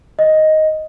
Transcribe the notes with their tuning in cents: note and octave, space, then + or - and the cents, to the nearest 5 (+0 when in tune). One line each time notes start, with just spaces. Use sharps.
D#5 +5